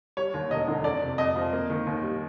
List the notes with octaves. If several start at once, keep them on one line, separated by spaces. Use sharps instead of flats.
G3 C#5
D#2
E1 D#5
D3
F2 D5
C3
F2 D#5
F3
A#3
D#3
D#2
G3